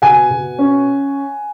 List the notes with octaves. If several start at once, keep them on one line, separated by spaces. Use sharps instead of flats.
B2 F#5 G#5
B2
C#4